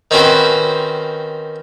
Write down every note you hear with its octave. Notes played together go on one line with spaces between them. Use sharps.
D#3 C4 C#4 F#4 B4 C5